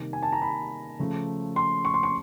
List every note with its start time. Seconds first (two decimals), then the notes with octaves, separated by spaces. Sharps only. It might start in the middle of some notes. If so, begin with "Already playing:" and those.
Already playing: C3 D#3 G3 A#3
0.13 G#5
0.23 A5
0.33 A#5
0.42 B5
0.99 C#3 F3 A3
1.56 C6
1.85 C#6
1.94 C6
2.03 C#6